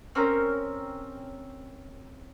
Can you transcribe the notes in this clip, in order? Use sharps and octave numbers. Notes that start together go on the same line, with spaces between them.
C4 C#4 G4 A#4